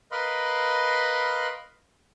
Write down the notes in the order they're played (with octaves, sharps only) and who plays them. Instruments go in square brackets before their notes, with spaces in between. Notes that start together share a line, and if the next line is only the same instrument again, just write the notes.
[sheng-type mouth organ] A#4 B4 D#5 F5 B5 C6